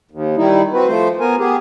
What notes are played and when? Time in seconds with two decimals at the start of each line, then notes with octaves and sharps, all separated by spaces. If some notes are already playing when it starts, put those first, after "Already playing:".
0.11 D#2
0.37 D#3 G3 D#4 E4
0.73 C4 F#4 B4
0.87 F3 A3 C5
1.20 B3 A#4 G#5
1.39 B3 G4 G#4